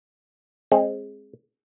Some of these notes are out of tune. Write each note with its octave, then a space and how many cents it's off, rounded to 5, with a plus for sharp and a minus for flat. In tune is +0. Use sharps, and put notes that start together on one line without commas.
G#3 +0 C4 +25